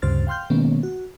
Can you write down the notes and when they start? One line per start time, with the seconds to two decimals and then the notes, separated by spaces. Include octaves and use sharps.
0.02 D2 G2 C#3 C5 F6 A6
0.27 F5 G5 C6 F6 G6
0.50 B2 D#3 G#3 A#3 B3 C#4
0.83 F#4